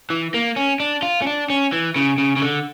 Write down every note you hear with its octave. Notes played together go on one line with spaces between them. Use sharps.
E3
A#3
C#4
D4
F4
C#4
D4
C#4
E3
C#3
C#3
C#3
D3